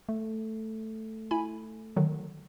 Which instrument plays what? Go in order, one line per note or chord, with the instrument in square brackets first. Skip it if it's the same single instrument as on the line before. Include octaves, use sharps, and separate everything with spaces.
[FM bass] A3
[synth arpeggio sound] E4 G#5 B5
D3 D#3 F#3